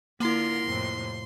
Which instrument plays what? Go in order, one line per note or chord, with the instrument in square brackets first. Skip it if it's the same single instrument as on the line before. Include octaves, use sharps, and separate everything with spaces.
[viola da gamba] D3 F4 A#4 [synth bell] A#3 E4 [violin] C6
[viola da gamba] F2 A2 C3